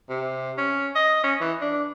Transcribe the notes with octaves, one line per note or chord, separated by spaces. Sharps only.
C3
C#4
D#5
C#4
E3
D4